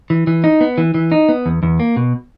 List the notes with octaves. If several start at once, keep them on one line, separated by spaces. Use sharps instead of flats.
E3
E3
D#4
B3
E3
E3
D#4
B3
E2
E2
A#3
B2